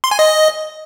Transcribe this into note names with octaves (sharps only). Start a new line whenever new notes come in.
C6
G#5
D#5